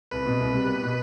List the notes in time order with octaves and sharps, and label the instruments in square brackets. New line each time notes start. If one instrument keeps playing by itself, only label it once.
[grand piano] C2 [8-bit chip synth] B4
[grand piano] B2
C2
G3
B3
B2